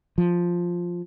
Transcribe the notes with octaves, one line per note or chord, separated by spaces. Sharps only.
F3